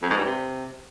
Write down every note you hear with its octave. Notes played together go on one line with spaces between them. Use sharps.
F2
G#2
G2
C3